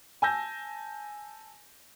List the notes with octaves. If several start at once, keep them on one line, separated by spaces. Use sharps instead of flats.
G#5 A5 E6 G6 A#6